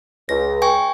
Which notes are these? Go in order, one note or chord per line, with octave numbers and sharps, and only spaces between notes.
C#2 A#6
G5 G#5 C#6